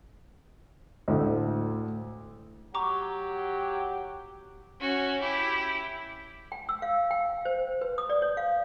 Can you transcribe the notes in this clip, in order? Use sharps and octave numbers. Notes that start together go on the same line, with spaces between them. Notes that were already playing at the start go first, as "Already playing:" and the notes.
D2 A2 A3
F#3 G4 A#5 C#6 D6
C#4 F#4
E4 G4
G5
E6
F5
G5
C5
B4
D#6
D5
C#5
F5